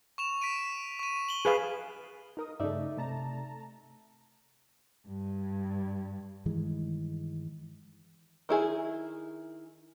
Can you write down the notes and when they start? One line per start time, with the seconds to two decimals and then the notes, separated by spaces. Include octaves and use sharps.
0.18 C#6 E7 F7
0.41 B6 D7 D#7
0.99 C#6 D#7
1.29 F#7 G7
1.45 G#4 B4 F5
2.37 D#4 A#4 D#6
2.60 G2 C#3 A3 D#4 D5 E5
2.97 C3 A3 A5 A#5
5.07 G2
6.46 G2 D#3 E3 G#3
8.49 D#3 E4 G#4